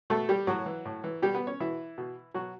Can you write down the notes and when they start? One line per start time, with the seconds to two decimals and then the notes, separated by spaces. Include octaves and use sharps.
0.10 B2 A3 A4
0.29 G3 G4
0.47 A2 F#3 F#4
0.66 E3
0.85 A2
1.04 E3
1.22 B2 G3 G4
1.35 B3 B4
1.47 C#4 C#5
1.60 B2 E3 E4
1.98 B2
2.34 B2 F#3 F#4